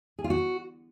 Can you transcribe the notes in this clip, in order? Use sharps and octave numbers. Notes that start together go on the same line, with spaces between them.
G#4
F4
F#4